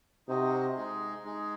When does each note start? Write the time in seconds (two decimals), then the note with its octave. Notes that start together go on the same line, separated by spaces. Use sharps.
0.28 C3 D#4 F#4 C5 D#5
0.76 G#3 D#4 G#4
1.24 G#3 D#4 G#4